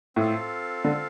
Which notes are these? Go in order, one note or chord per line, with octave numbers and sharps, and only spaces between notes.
A2 C4 F4 A4 F5
D3